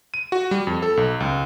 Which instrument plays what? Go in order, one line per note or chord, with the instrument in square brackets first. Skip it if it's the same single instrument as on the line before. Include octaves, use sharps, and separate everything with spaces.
[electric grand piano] D#7
F#4
G3
F2
A4
B1
C#2